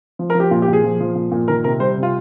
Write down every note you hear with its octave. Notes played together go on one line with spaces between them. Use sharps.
F3
A#4
F3
G4
A#2 F4
G4
A#2
G#4
F3
F3
A#2
A#2
D#3 A#4
C3 A#4
G3 C5
C3
F4